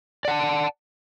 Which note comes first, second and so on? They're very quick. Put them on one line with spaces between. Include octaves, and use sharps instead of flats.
D5 F#5 A5